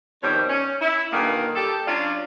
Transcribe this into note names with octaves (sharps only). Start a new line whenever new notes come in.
F2 B2 D#3 G3 C5 C#5
C#4
E4
G2 A#2 D3 D#3 A#3
G4 A4
F#3 C#4 D4 F4 D5 F5